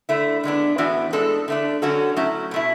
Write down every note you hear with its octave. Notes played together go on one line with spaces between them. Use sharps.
D3 A3 E4
D3 G#3 B3 D4
A2 E3 B3 D4 F#4
A2 G#3 D4 A4
D3 A3 D4
D3 F#3 C#4 F#4 A4
F#3 A3 C#4 E4
B2 A3 E4